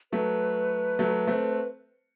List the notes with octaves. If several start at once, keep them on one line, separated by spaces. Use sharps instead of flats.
F#3 A3 B4
F#3 A3
A3 C4